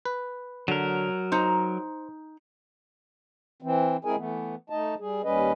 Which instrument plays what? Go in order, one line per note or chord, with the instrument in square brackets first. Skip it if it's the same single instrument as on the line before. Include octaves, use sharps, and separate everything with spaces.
[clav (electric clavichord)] B4
[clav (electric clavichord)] D3 [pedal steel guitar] F#3 A#4
[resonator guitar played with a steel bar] D#4 A#5 [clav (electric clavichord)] C5
[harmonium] E3 C4
G#3 C4 E4 G#4 A#4 G#5
E3 A3 B3
A3 D#4 D#5 A5
G3 G#4
D#2 G3 C#4 B4 D#5